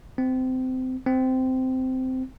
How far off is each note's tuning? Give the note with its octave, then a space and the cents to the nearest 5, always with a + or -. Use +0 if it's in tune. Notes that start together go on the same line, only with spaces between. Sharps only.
C4 -25
C4 -15